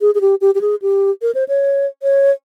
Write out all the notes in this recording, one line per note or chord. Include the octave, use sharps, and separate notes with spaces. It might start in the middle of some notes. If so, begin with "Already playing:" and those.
G#4
G#4
G4
G4
G4
G#4
G4
A#4
C5
C#5
C#5